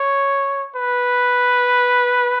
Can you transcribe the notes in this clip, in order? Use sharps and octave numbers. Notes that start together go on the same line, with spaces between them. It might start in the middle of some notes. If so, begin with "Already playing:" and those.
Already playing: C#5
B4